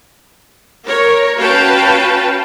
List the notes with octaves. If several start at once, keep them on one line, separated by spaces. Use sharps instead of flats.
A#4 C#5
C#4 F#4 B4 F5 G5 A5